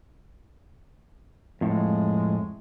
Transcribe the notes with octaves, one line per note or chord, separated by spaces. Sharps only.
F2 A2 G#3